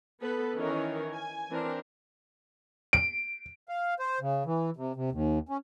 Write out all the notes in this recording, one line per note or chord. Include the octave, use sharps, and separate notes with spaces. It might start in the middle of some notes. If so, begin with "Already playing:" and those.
B3 A4 B4
D#3 E3 C#4 A#4 C#5
G#5
E3 C4 D4 A#4
D7
F5
C5
C#3
E3
C3
C3
D#2
C#4